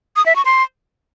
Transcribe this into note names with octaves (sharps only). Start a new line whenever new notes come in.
D#6
E5
C#6
C6